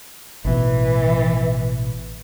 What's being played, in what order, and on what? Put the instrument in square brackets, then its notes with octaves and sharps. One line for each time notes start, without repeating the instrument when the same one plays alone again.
[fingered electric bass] A1 B2 [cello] E3